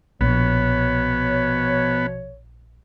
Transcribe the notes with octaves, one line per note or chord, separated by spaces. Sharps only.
A#1 B2 F3 B3 C#5